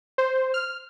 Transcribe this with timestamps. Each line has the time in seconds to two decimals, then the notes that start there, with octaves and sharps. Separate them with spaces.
0.18 C5
0.54 F6